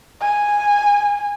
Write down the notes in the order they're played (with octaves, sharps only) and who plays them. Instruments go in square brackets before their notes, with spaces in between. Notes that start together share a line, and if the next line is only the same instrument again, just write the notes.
[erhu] G#5